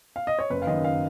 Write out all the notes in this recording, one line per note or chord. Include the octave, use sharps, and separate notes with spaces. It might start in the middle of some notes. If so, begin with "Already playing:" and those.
F5
D#5
C#5
F#1 B4
F5
F#2 D#3 D#5
F5